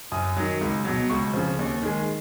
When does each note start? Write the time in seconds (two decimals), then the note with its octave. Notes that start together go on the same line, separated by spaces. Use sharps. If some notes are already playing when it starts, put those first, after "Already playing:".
0.12 F#2 D#6
0.36 D#3 F#3
0.61 C#2
0.85 B2 F#3
1.10 C#2 C#6
1.34 C#3 F3
1.59 D#2
1.83 D#3 G#3